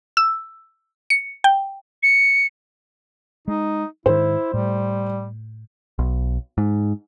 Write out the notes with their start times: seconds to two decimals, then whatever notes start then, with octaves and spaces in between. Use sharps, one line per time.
0.17 E6
1.10 C#7
1.44 G5
2.03 C#7
3.48 G#3 D#4
4.06 G#2 D#3 E4 C5
4.54 A2 G3
5.99 B1
6.58 G#2